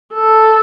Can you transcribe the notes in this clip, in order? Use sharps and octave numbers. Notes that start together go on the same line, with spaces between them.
A4